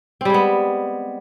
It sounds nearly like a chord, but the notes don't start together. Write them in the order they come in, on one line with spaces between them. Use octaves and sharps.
C4 G3 G#3 B3